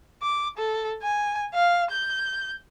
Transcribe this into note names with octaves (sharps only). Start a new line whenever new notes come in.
D6
A4
G#5
F5
G6